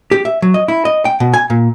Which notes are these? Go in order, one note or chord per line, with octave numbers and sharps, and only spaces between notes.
G4
E5
F#3
D#5
E4
D#5
G5
B2
G#5
A#2